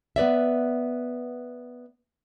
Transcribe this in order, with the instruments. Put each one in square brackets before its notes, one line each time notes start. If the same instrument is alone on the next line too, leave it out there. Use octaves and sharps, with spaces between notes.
[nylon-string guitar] B3 B4 D5 E5